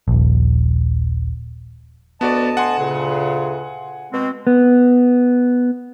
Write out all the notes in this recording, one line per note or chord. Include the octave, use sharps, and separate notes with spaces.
D#1 A#1
D2 B3 F#4 D5 D#5 A5
F#5 G#5 C6
D2 A#2 C#3
B2 G#3 C4
B3